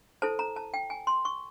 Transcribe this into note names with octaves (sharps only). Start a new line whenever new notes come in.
E4 A4 C5 A5
A#5
A5
G5
G#5
C6
C#6